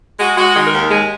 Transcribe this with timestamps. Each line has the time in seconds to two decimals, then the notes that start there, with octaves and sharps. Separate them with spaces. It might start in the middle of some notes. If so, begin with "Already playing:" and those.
0.20 G#3 F#4
0.37 G#3 F#4
0.55 D#3 G#4
0.67 A#4
0.73 D#2
0.90 G#3